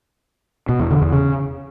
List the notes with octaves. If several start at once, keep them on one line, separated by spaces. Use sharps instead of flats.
B2
E2
D3
E2
C#3